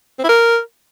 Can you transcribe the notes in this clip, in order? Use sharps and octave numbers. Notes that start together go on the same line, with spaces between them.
C4
E4
A#4